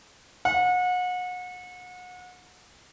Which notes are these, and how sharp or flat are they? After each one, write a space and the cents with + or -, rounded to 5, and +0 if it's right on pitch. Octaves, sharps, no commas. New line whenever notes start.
F#5 -35